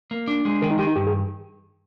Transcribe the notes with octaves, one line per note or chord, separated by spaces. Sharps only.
A#3
D4
G#3
D#3 A#4
D#4
D#3 G4
D#4
G2 G4
G#4